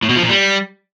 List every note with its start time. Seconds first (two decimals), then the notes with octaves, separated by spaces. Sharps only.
0.03 A2
0.09 B2
0.16 F3
0.23 A#2
0.30 G3